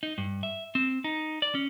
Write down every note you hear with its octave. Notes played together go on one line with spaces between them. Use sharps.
D#4
G2
E5
C4
D#4
D5
C#4